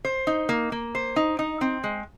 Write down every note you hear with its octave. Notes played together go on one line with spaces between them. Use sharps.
C5
D#4
A#3
A#3
C5
D#4
D#4
C4
G#3